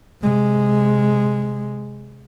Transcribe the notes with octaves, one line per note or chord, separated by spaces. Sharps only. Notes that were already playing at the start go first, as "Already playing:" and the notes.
C3 G#3